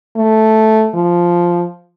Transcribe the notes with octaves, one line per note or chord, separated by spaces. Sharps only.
A3
F3